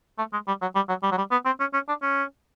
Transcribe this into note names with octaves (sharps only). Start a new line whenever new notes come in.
A3
G#3
G3
F#3
G3
F#3
G3
F#3
G3
B3
C4
C#4
C#4
D4
C#4